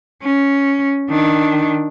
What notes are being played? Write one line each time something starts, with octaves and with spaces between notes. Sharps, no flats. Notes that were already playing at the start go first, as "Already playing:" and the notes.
C#4
D#3 D4